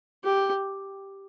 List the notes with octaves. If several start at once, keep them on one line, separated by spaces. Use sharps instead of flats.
G4